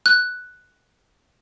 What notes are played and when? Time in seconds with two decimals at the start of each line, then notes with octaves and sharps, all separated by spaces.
0.06 F#6